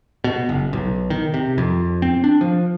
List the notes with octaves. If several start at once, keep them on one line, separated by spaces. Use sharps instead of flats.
B2
F#1
B1
D#3
C3
F2
C4
D4
F3